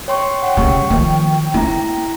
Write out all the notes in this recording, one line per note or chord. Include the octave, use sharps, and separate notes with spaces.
C#5 G5 C6 C#6
C#5 F#5
C#3 G3 C#6
D#3 F3
B3 E4 A#5